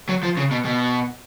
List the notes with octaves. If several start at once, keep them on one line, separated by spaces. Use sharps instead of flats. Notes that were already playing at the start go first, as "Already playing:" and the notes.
F#3
F3
C#3
B2
B2